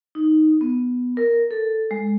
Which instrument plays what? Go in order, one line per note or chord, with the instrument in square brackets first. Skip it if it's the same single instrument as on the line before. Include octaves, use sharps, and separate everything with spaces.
[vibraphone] D#4
B3
A#4
A4
G#3